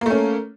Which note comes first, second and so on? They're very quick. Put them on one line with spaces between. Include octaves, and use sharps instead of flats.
A#3 A3 C#4